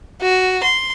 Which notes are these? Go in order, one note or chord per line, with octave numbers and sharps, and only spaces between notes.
F#4
C6